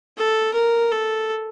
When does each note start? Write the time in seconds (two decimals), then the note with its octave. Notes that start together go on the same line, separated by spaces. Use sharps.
0.17 A4
0.54 A#4
0.92 A4